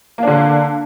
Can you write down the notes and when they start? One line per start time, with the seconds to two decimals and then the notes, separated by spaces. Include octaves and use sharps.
0.18 A#3
0.23 D4
0.28 D3